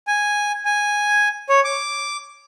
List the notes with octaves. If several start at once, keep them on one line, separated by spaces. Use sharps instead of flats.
G#5
G#5
C#5
D6